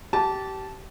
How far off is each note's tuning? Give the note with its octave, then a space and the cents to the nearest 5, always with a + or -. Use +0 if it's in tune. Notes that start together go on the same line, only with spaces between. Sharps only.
G4 -25 A5 -10